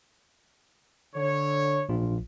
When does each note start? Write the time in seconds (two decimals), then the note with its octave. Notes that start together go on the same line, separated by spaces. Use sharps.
1.16 D3 C#5
1.89 A#1 F4